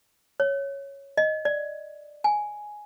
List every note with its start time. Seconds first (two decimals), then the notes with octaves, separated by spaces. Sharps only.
0.40 C#5
1.17 D#5
1.45 D5
2.24 G#5